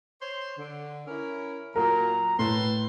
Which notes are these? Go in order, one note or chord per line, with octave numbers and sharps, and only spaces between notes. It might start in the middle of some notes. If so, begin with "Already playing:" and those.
C5 C#5 C6
D3
C#4 E4 A#4
A#2 F#3 F#4 A#4 A#5
A2 B4 A5 C6